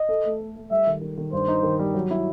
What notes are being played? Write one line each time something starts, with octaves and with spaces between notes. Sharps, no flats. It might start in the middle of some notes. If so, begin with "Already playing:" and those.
Already playing: D#5
A4
A3
A3
A3
G3 E5
D#3
D#3
D#3
G2 C5
D#4
D#3
G3
F#3
E4